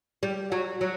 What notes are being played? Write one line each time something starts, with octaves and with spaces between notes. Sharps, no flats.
G3
F#3
F#3